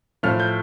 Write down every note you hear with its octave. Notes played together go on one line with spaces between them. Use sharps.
A2 F3 A3 F6
G6